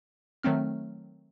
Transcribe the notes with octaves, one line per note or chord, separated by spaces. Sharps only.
D#3 F#3 A3 C4 F6